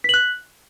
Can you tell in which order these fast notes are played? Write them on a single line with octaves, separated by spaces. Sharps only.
B6 F#7 F#6